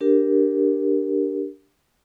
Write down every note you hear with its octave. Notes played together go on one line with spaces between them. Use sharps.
D4 G4 A#4